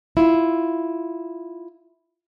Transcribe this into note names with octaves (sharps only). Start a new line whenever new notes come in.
E4 F4